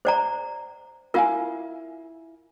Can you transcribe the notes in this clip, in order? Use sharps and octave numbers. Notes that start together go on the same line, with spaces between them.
C5 D5 A#5
E4 F4 A#4 F5 G#5